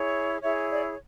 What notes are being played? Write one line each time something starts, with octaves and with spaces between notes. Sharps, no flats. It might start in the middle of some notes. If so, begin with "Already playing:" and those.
Already playing: E4 G#4 C#5
E4 G#4 C#5 E5
D5